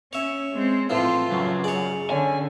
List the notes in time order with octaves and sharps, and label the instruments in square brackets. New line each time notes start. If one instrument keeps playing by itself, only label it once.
[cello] C#4 [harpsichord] C#5 E5
[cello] G#3 C4
[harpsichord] A2 E3 F3 [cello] C4 F4
[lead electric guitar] F#2 [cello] C#3
[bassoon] G#4 [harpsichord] C#5 D5
[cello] D3 [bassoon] C#4 [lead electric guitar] G#5